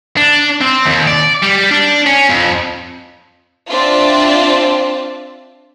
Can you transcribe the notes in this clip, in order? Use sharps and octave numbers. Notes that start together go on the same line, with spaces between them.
D4
C4
D#2
D5
G3
D4
C#4
F2
C4 D4 F4 D5 E5 A5